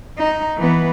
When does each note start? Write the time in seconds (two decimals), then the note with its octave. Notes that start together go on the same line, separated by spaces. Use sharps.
0.18 D#4
0.58 E3 B3